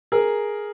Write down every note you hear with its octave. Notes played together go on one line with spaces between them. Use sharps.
G#4 A#4